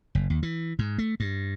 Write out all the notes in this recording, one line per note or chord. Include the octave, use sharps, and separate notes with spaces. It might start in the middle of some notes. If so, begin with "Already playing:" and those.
F#1
D#2
E3
G#2
A3
G2